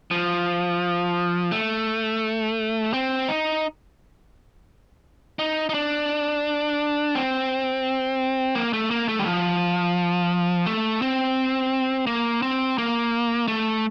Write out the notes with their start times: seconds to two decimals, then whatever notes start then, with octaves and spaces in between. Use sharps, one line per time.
0.11 F3
1.52 A3
2.93 C4
3.28 D#4
5.39 D#4
5.69 D#4
5.74 D4
7.15 C4
8.55 A#3
8.73 A3
8.91 A#3
9.09 A3
9.19 G3
9.26 F3
10.66 A3
11.02 C4
12.07 A#3
12.42 C4
12.78 A#3
13.48 A3